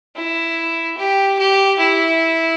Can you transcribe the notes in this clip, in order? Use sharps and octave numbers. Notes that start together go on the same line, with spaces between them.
E4
G4
G4
E4